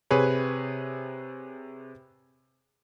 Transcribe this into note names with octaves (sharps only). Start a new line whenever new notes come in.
C3 G#4 B4 C#5